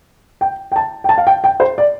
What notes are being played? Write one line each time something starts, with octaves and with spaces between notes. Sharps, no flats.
G5
G5
A5
G5
A5
F5
G5
G5
C5
D5